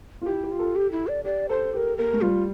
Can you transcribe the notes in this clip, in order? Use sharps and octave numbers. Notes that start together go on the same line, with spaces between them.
F4
E4 G4
G4
F4
A4
G4
E4
D5
G4 D5
A4 C5
G4 A#4 C5
A#3 A#4
A3
G3 F4